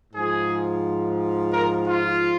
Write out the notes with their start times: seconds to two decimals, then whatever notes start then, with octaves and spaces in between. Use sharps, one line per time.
0.14 G#2 F3 G#4
1.52 A#4
1.86 F4